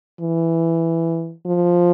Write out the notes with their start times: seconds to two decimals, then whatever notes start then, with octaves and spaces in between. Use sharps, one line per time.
0.21 E3
1.46 F3